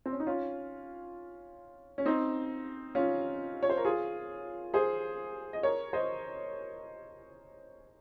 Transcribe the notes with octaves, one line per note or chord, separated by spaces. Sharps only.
C4
C#4
D#4
C#4 F4
C#4
C4 D#4
C#4 F4
C#5
C5
A#4
F4 G#4
G#4 C5
D#5
A#4 C#5
C5 D#5